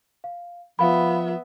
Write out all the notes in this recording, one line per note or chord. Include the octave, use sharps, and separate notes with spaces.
F5
F3 B3 E5 F5 B5